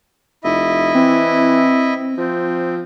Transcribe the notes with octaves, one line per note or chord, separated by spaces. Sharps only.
F1 E4 D#5 E5
E3 C4
F3 C4